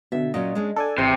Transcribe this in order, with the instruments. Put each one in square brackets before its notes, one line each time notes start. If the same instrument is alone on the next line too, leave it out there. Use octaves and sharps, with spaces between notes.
[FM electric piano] B2 D3 [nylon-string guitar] E5
[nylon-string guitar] A#2 F#3 C#4 [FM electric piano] D#5
[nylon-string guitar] G#3 C#4 D4
[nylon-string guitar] D4 [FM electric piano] A4 D5 G#5
[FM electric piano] G#1 [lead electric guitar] C3 [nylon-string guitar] E3